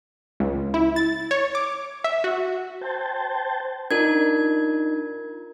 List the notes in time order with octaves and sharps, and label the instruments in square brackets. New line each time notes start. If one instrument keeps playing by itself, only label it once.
[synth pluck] C#2
E4
A6
C#5
D6
E5
F#4
[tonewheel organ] C5 G5 A5
[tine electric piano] D4 D#4 [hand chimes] F4 A#4 G#6